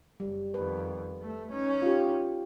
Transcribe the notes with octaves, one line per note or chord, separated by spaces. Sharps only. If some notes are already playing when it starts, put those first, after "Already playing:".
F#1 G3
F2 D#3 B4
A3
C#4 D#4
F4 G4